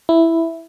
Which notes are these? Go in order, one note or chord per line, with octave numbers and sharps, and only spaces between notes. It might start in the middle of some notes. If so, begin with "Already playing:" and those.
E4